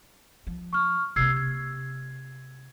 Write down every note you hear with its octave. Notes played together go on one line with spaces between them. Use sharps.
F3
C#6 F6
C3 A#3 E6 G#6 C7
G#6